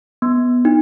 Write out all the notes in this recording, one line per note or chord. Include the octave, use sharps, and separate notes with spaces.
B3
D#4